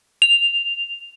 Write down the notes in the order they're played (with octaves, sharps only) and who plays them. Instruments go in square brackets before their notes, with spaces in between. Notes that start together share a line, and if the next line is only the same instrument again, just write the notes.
[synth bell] F7